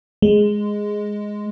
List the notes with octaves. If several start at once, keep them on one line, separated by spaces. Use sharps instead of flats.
G#3